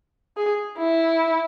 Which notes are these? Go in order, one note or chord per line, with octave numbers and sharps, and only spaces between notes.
G#4
E4